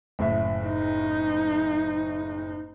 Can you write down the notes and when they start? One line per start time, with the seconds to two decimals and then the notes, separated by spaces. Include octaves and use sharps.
0.19 F#1 A2 E5
0.67 D#4